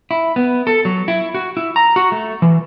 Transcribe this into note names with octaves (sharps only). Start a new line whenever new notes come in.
E4
B3
A4
F#3
E4
F#4
E4
A#5
F#4
A3
E3